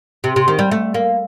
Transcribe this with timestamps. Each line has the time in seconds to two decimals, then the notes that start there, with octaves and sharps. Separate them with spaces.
0.24 C3
0.36 C3
0.48 D#3
0.59 G3
0.71 A3
0.94 A#3